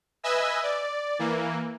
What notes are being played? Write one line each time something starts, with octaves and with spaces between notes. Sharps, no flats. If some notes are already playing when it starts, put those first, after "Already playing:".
B4 D#5 E5 G#5 E6
D5
E3 A#3